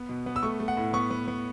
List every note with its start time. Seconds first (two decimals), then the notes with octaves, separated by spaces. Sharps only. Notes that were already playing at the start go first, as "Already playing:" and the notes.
Already playing: B3
0.09 B2
0.26 B3
0.36 E6
0.43 A3 C#6
0.60 A3
0.68 F#5
0.77 A2
0.93 B3 C#6
1.11 B3
1.28 B3